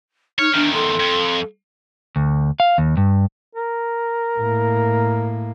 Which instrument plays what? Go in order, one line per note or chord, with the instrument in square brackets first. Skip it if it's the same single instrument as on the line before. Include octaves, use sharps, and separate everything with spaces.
[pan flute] D#4 [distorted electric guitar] C#5 [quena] F6
[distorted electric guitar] E2 D#3 [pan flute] D4
[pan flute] A4 [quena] C6
[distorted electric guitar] F2
[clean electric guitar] D2
F5
D#2
G2
[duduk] A#4
[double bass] A2 A#3